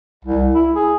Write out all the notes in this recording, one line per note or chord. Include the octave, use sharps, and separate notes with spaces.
C2
E4
G#4